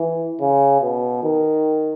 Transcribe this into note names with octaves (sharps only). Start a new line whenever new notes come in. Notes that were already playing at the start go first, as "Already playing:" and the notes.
Already playing: E3
C#3
B2
D#3